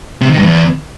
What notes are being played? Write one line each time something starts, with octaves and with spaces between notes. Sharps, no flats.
C3
D#3
G2
E2